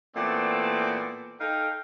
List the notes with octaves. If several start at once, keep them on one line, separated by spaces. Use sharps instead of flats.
A#2 E3 A3 B3 C4 D5
D#4 A4 F5 G5